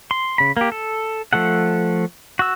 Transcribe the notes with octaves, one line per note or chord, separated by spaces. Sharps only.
C6
C#3 B5
A#3 G4
A4
F3 A3 A4 F#5
F#4 E6